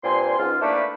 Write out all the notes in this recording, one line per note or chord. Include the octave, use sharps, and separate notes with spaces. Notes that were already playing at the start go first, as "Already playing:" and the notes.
G2 A#2 C4 G#5 C6
C#2 G#2 F4
A3 A#3 D4 E4 G4 B4